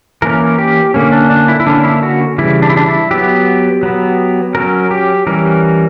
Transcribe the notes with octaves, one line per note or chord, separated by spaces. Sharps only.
E3 A#3 C#4 A#4
G4
D3 A#3 C#4
D4
D4
E4
E4
D3 A#3 C#4 D4
E4
F#4
C#3 E3 G3 E4
D4
E4
D4
E4
F#3 B3 G4
F#3 B3
F#3 C#4 A#4
G4
E3 G3 C#4 A#4